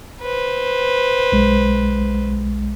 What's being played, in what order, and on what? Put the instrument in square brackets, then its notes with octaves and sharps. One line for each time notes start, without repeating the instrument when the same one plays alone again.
[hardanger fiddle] B4 C5
[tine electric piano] B1 G#3